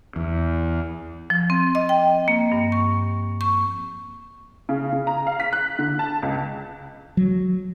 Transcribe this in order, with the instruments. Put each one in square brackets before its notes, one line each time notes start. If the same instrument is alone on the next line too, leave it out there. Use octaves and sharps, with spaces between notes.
[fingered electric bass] E2
[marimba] F3
C4
D#5
G5
A#3
G2
C#6
C#6
[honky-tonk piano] C#3
C#3
A#5
F5
B6
F#6
D3
A5
C#2
[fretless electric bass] F#3